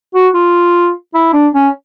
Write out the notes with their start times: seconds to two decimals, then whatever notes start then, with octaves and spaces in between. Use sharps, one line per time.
0.14 F#4
0.34 F4
1.14 E4
1.34 D4
1.55 C#4